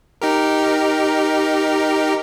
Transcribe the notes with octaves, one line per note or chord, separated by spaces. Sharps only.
D#4 G4 A#4